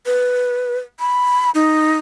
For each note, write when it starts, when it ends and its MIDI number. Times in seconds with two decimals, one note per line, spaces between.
0.06 0.78 71
1.00 1.50 83
1.54 1.99 63